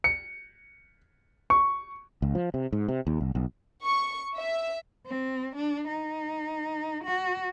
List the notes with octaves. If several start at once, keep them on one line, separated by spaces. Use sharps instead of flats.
C#7
C#6
C#2
F3
C3
G#2
C3
D#2
C2
B1
C#6
E5
C4
D4
D#4
F#4